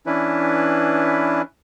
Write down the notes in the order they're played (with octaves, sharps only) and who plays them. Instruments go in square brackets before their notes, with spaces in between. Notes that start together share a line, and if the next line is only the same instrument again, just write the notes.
[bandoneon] E3 C#4 D4 E4 B4